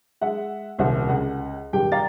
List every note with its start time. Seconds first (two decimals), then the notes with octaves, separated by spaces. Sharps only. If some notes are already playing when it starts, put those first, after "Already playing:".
0.21 G#3 E5 F#5
0.78 D#1 C2 C5 E5 F#5
1.09 C#2 F#5
1.73 D#1 G2 G4 G5
1.92 D5 F5 G5 A#5 A6